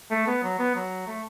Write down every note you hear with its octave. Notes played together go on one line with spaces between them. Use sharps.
A3
B3
F#3
B3
F#3
A3